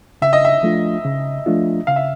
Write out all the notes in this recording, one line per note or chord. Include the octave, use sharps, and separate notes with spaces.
C#3 E5
D#5
E5
F3 A3 D4 F4
C#3
F3 A3 D4 F4
C#3 F5
E5